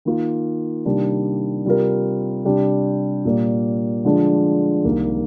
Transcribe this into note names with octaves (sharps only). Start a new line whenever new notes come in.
D#3 A#3 F4
C3 D#3 G3 A#3 D4
C3 G3 C4 F4 A#4
C3 G3 D4 G4
A#2 G3 A#3
D3 F3 G#3 D4
C2 C3 D#3 A#3